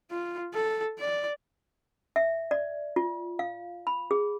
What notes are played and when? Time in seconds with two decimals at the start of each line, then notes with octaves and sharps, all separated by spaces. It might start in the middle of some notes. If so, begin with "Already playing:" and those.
0.10 F4
0.54 A4
0.99 D5
2.16 E5
2.51 D5
2.96 F4
3.39 F5
3.87 B5
4.11 G#4